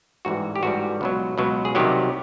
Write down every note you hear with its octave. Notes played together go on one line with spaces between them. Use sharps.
A1 G#2 E3 G3 F#4
G4
A1 G#2 E3 G3 F#4
C#2 B2 F#3
C#2 B2 F#3
G#4
C2 C3 D#3 F#3 G4